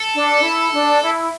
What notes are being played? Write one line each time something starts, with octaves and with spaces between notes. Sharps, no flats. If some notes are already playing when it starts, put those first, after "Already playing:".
Already playing: A4
D4
E4
D4
E4